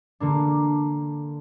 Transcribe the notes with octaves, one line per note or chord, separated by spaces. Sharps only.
D3 A#3 D4